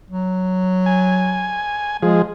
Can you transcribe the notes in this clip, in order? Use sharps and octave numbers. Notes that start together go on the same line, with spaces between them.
F#3
G#5
F3 G#3 G#4